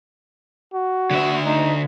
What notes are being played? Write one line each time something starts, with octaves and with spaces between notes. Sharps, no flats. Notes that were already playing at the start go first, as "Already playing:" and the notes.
F#4
D3 E5
D#4